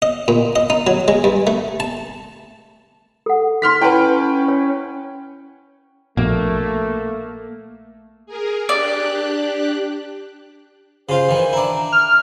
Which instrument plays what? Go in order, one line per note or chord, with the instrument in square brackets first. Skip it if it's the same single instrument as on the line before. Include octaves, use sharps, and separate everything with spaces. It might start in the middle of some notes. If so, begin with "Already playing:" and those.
[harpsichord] D#5
A#2
D#5
D#4
F#3
G#3
G2
A3
A5
[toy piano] A4 F#5
[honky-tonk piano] C6 F6 B6
[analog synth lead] C#4 [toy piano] E4 [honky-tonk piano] B4 F#5 G5
[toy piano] C#5
[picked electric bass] A#1 B2 [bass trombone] A3 [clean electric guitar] A#3
[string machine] G#4 A#4
[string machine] D4 G4 F#6 [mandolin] D5
[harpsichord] C#3 F4 [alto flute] C5
[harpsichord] D#3 E3
[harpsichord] D4 E4 [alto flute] A#5
[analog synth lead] F6